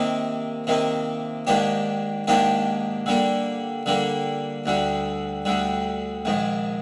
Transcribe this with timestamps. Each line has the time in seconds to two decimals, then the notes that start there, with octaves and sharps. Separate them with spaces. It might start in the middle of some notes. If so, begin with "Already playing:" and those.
Already playing: C3 D#3 A#3 D#4
0.67 C3 D#3 A#3 D#4
1.47 G#2 D#3 A#3 D4 G4
2.27 G#2 D#3 A#3 D4 G4
3.06 D3 G3 A#3
3.86 D3 G3 A#3
4.66 D2 D3 G3
5.45 D2 D3 G3
6.25 A#1 G#2 D#3